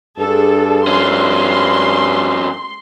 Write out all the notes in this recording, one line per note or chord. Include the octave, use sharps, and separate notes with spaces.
G2 D4 G#4 A4
F2 C#4 C6